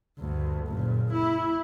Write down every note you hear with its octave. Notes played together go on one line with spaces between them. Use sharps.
D2 G2
F#1 A#2
E4